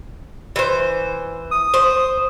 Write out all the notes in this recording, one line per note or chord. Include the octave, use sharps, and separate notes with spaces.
E3 C5
D#6
C5